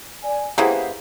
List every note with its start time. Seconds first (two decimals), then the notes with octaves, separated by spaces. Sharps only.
0.23 D5 G#5
0.58 C#3 E3 A#3 G4 G#4 C5 F#5